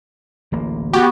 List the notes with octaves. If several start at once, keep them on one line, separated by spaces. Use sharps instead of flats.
D1 A1 A#3
B3 F#4 G4